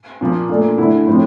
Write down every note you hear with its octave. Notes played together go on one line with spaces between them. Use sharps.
A#2 F3 A#3
A#2 A3 D4
D3 A3 E4
A2 F3 C4